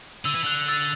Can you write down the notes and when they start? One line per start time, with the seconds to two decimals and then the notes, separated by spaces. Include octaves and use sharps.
0.25 D3 E6
0.35 E3
0.44 D3 F#6
0.68 E6 A6